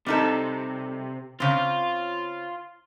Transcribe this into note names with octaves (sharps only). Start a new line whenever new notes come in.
C3 G3 D#4 A4
C#3 C4 F4